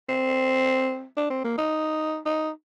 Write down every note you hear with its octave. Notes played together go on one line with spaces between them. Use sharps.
C4
D4
C4
A#3
D#4
D#4